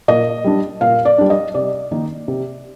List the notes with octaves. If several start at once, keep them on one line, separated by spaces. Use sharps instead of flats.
A#2 D#5
G3 D4
A#2 F5
D5
G3 D4
D#5
C3 D5
D#3 A#3 D#4
C3